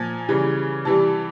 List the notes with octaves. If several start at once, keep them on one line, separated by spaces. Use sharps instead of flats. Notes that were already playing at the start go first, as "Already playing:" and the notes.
Already playing: A#2 F3 G#5
C#3 E3 G3
C3 E3 G3 A5